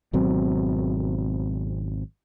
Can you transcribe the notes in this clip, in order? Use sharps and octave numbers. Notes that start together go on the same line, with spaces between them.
G#1 B2 F#3 C4